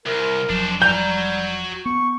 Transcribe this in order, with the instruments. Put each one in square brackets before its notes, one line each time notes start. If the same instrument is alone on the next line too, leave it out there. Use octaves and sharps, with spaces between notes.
[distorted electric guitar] C2 [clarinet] A#4
[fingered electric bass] F1 F3 F#3 [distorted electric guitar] D4 C5
[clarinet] G3 [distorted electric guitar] F#4 A#5 [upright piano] G6
[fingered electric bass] B3 [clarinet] C#6